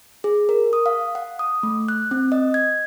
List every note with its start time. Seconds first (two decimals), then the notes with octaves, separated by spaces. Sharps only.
0.24 G#4
0.49 A#4
0.73 D#6
0.86 F5
1.15 F#5
1.39 D#6
1.63 A3
1.88 F#6
2.11 C4
2.32 D#5
2.54 G#6